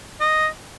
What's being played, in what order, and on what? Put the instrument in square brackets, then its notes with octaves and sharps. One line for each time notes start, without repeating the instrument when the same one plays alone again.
[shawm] D#5